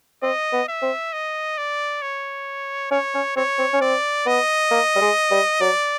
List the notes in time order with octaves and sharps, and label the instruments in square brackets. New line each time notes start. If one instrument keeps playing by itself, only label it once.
[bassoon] C4 [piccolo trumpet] D#5
[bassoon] B3
[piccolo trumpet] E5
[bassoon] C4
[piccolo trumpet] D#5
D5
C#5
[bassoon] C#4 [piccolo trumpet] C#5
[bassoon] C#4
[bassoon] C4 [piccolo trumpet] C#5
[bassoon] C4
C#4
[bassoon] C4 [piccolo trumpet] D5
[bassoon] B3 [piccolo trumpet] D#5
[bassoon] A#3
G3
G#3
G3
[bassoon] F#3 [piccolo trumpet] D5